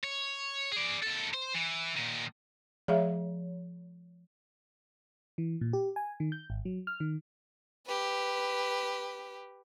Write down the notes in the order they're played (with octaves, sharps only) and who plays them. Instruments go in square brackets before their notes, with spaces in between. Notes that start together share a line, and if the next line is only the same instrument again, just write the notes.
[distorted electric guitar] C#5
G#4 D5
D#2 A4
C5
E3
A#2 D#3
[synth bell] F3 [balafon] G#4 E5 F5
[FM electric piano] E3
A#2
G4
G#5
D#3
G6
G#1
F#3
F6
D#3
[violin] G4 B4